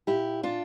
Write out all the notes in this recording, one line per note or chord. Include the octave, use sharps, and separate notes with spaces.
A#2 E4 G4
D4 F4